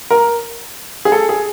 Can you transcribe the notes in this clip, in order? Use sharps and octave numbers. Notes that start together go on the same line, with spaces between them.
A#4
G#4
A4
G#4